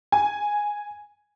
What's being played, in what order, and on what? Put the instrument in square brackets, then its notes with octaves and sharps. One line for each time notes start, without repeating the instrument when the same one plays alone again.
[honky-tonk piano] G#5